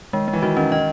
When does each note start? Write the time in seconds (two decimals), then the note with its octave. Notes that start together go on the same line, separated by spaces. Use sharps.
0.13 D#3 G#3
0.28 G#3
0.33 E3
0.42 D#3 F#4
0.57 D#3 C#4
0.72 D#3 D#5